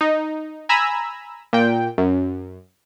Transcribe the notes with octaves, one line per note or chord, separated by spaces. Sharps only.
D#4
G#5 A#5 B5 E6
A#2 G5
F#2